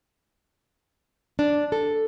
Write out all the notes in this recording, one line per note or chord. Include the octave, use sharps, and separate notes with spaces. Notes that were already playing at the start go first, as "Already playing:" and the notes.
D4
A4